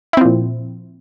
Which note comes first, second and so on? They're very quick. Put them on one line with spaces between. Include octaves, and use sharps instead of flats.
E4 C4 F3 A#2